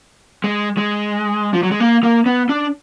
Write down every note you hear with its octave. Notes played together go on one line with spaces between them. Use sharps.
G#3
G#3
F3
F#3
G#3
A#3
A#3
B3
D4